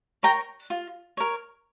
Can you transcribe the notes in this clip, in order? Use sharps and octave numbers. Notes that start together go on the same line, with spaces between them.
A#4 C#5 G5 A#5
F4
A#4 C#5